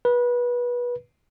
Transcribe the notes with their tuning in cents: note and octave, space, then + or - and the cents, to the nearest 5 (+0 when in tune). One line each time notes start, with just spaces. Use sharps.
B4 -25